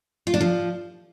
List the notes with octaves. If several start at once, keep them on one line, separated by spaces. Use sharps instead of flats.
F4
D4
F3